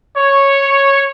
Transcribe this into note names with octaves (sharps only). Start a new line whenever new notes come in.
C#5